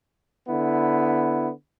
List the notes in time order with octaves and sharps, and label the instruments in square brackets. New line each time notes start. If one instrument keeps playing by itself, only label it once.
[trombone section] D3 B3 E4